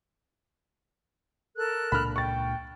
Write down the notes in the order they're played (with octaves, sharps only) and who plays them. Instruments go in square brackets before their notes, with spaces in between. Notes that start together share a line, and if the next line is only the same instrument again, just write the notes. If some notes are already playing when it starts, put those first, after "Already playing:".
[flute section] A4 A#4 F#6
[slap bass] C#2 A#2 D4 [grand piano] B5 F6
[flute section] G5 [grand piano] C#6 A6